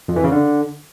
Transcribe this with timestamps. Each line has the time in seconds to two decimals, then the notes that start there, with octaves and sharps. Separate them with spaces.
0.08 F2
0.16 E3
0.24 C#3
0.31 D3